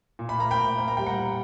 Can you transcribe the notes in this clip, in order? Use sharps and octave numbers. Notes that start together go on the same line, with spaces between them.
A#2
B5
A#3 A#5
G5 B5
A#2
A#3 B5
A#5
G3 G5
F#5 A#5
A#2